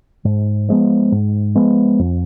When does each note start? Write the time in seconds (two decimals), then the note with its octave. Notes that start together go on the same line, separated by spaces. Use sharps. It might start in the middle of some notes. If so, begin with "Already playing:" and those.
0.25 G#2
0.69 F3 G#3 B3
1.12 G#2
1.55 F3 G#3 B3
1.99 F2